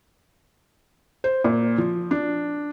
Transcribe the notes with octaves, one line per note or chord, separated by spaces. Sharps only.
C5
A#2
F3
D4